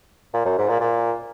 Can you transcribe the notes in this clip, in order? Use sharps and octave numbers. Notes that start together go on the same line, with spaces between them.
A#2
F#2
G#2
A#2
A#2